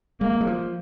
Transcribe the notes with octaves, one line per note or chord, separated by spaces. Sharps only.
G#3 A#3
G#3
F3